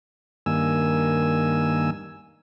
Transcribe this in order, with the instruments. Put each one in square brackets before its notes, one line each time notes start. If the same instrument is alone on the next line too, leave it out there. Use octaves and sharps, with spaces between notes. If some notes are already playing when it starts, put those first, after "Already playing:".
[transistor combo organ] G2 D#3 A#3 G#5 E6